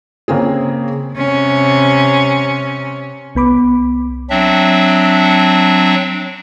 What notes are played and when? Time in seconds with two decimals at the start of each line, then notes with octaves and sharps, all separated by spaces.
0.28 C#3 A#3 C4 G#4
1.15 C3 C#4
3.35 C2 B3 B5 D6
4.30 F#3 C4 D4 E5